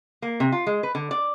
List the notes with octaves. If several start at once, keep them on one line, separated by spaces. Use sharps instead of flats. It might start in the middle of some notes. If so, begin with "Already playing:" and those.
A#3
C3
F4
G#3
B4
D3
D5